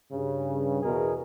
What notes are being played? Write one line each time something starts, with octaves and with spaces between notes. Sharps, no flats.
G2 C#3
E2 B2 G#4 A#4